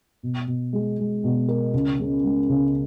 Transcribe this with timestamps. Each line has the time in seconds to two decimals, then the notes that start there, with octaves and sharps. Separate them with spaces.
0.23 B2
0.47 B2
0.73 G#3
0.98 G#3
1.24 B2
1.48 A#4
1.74 C#2
1.99 C#3
2.24 G#3
2.49 C#2